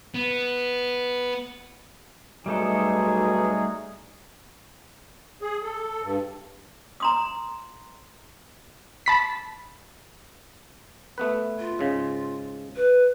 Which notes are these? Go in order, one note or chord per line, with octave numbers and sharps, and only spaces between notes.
B3
B1 G3 A3 D#4 F#4 G#4 A4
G#4
A4
G2
A#5 C6 D#6
A5 B5 B6
A3 B3 B4
F4
G#2 C#3
B4